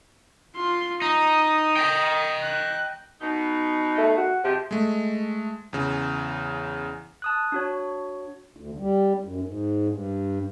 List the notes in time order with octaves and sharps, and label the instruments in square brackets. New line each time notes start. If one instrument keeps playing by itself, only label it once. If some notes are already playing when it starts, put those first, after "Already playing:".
[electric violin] F4 C6
[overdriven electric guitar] D#4 [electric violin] D#6
[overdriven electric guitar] D#5 G5
[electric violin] F#6
[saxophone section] B2 D#4
[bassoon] A3
F#4
[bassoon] C3 [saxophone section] F3 G#3 G4
[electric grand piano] G#3 A3
E2 C#3
[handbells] A5 D#6 F#6
D4 F#4 C#5
[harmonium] D2
G3
F#2
G#2
G2